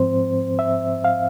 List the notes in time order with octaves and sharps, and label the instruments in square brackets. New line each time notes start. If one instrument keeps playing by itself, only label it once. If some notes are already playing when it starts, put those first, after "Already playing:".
Already playing: [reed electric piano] G#2 F3 C4 C5
E5
F5